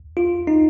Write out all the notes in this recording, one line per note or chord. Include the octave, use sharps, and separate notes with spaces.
F4
D#4